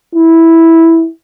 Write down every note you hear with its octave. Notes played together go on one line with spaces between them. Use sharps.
E4